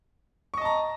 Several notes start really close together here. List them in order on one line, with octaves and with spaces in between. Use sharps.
C#6 D#5 A5 A#5